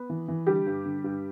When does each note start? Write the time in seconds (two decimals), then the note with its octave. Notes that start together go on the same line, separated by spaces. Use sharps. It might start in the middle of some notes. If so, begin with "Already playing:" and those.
Already playing: B3 B4
0.10 E3
0.28 E3
0.47 D3 G3 G4
0.66 G2
0.85 D3
1.04 G2